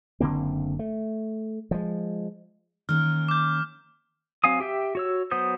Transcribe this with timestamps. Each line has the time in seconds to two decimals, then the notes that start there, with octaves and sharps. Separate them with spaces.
0.20 F#1 D3 A#3 C4
0.79 A3
1.71 F3 G#3
2.89 D#3 A#3 C#4 F6
3.29 D6 G6
4.44 F#3 C4 F5 G#5 D#6
4.60 G4 E5 G5
4.95 F#4 C#5 E6
5.31 F#3 B3 C5 D#6 G6